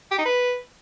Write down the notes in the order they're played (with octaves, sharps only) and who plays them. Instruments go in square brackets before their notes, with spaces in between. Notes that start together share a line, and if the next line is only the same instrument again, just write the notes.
[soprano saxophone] G4
D#4
B4